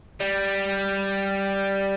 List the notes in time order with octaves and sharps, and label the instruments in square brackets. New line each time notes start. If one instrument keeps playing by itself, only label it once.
[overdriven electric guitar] G3